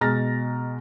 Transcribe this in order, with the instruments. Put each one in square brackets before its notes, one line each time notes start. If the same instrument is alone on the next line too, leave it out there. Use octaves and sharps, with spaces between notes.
[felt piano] B2 G#3 A#5 F6 A6 A#6